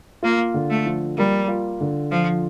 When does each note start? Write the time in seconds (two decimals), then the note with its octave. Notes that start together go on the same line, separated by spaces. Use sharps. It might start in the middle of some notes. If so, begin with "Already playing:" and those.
0.23 A#3 F4
0.54 D3
0.70 A3
0.86 F3
1.17 G3 A#3
1.48 F4
1.81 D3
2.11 F3 F4